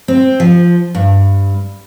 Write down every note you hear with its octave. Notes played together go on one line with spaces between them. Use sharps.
C4
F3
G2